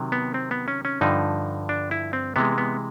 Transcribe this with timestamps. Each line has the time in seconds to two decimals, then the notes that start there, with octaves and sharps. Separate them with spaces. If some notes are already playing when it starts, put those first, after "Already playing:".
Already playing: C3 D#3 F#3
0.12 B3
0.34 C4
0.51 B3
0.68 C#4
0.85 C#4
1.01 G2 D3 F3 D#4
1.69 D4
1.91 E4
2.13 C4
2.36 C3 E3 G#3 B3
2.58 B3